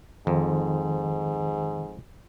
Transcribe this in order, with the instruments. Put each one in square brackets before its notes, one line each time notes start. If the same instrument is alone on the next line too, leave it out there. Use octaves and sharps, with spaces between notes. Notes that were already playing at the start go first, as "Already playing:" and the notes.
[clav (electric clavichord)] F2 [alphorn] G#2 [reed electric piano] D#3